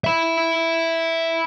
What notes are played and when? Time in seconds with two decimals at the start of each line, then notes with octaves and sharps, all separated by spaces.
0.04 E5 B5